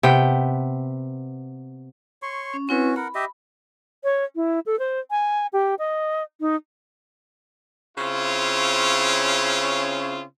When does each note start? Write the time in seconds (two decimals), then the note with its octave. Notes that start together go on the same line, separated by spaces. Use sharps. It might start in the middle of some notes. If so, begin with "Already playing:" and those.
0.03 C3 B3 B4 G5
2.22 C#5 C6 C#6
2.54 C#4
2.69 C4 C#4 E4 F#4 B4
2.96 A#4 F#5 B5
3.15 G4 D#5 E5
4.04 C#5
4.36 E4
4.66 A4
4.79 C5
5.11 G#5
5.53 G4
5.79 D#5
6.40 D#4
7.98 C#3 C4 C#4 E4 F4